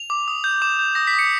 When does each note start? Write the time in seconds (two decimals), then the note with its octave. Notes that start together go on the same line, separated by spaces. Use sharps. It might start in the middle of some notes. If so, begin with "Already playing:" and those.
Already playing: F7
0.10 D6
0.28 D#6
0.44 G6
0.62 D6 E7
0.79 G6
0.95 D#6 A#6
1.07 B6
1.13 D#6
1.19 C#7